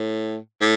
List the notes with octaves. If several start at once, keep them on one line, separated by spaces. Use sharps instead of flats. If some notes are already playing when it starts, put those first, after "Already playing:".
Already playing: A2
A2